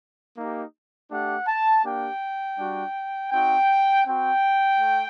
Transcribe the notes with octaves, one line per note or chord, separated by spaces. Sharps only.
A#3 D#4 G4
A3 D4 G4 F#5
A5
A#3 D4 G4 G5
G3 D4 F#4
C4 D#4 F#4 G5
C4 F#4 G5
A3